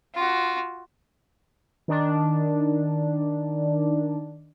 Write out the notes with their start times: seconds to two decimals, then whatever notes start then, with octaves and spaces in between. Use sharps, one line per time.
0.15 F4 F#4
1.88 D#3 D4